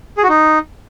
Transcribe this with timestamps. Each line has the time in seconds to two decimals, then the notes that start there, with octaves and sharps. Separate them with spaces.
0.17 G#4
0.23 F#4
0.29 D#4